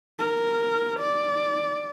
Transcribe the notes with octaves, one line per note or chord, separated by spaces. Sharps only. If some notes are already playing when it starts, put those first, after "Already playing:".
A#4
D5